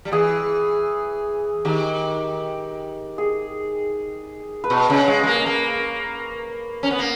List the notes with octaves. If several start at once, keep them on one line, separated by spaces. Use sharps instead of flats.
G3
E3 G#4
D#3 G4
G#4
B4
B2 C#5
C#3
G#3
G#3
A#3
A#3
C#4
B3
A#3